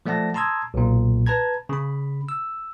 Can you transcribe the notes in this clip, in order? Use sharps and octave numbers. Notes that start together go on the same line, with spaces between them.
F3 A3 D5 F#5 A5 A#6
A5 A#5 C6 D#6 E6 G#6
B1 A#2
B4 A5 A#5 G#6
C#3 B5
E6